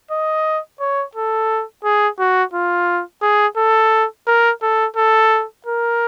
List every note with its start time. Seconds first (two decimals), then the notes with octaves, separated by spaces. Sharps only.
0.11 D#5
0.80 C#5
1.15 A4
1.84 G#4
2.19 F#4
2.53 F4
3.22 G#4
3.57 A4
4.27 A#4
4.62 A4
4.96 A4
5.66 A#4